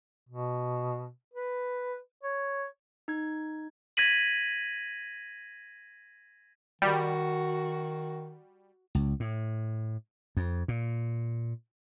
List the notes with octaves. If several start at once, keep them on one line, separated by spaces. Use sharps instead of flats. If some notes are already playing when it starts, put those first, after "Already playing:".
B2
B4
C#5
D#4 G#6
G#6 A#6 B6 D#7 F#7
D#3 G3 F#4
C#2
A2
F2
A#2